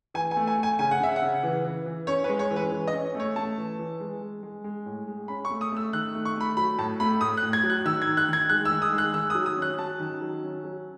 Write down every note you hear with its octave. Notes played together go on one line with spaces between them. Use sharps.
E3 G#5
G#5
A3
G#5
A3
G#5
C#3 G#5
F#5
C#3 E5
F#5
C#3
E3
E3
E3
C#4 C#5
B4
G#3
C#5
E3
B4
E3
D#5
C#4
A3 C#5
A3 A5
E3
E3
G#3
G#3
G#3
G#3
A2
G#3
C#4 B5
C#6
A3
D#6
A3 E6
D#3 F#6
A3
C#6
A3 B5
F#3 B5
A2 A5
A3 B5
A2 D#6
F#6
A2
G#6
F#3
F#6
D#3 E6
G#6
D#3
F#6
D#3 G#6
G#3 F#6
E6
D#3
D#6
G#3
F#6
D#3 E6
D#6
F#3
D#6
C#4
F#6
F#3 A5
D#3
F#3
C#4
F#3